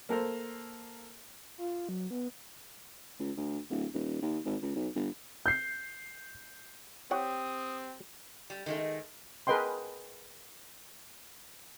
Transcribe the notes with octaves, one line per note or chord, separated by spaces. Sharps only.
A#3 A4 A#4 C5
F4
F#3
B3
C#2
D2
D1
D#1
D#2
G#1
C#2
B1
G1
G6 C7
C4 G4 C#5 F#5 G5 D#6
G3
D#3 G#3 A3
G#4 A#4 B4 D#5 G5 C6